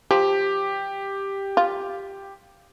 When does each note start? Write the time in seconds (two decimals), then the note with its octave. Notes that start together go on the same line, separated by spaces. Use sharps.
0.11 F3 G4
1.57 F4